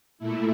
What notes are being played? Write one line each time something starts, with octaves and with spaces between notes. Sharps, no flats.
A#2 A3 E4